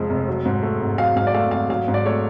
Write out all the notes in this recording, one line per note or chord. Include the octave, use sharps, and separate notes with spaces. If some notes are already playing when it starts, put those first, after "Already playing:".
Already playing: F1 F2 F3 G#3
F1
F#3
G#2
A3
G#1
F#3 F5
G#2 F5
D5
A3 F5
G#1 F5
F#3 F5
G#2
D5
A3 C#5